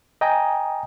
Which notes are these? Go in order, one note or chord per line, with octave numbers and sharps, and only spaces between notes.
D#5 G5 G#5 A#5 D#6